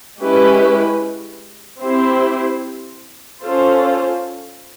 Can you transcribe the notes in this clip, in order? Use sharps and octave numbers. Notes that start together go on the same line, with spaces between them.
G#3 C#4 E4 G4 B4
C4 E4 G4 C5
C#4 F4 A4 C5